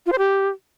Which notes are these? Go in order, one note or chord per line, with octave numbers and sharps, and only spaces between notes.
F4
C5
G4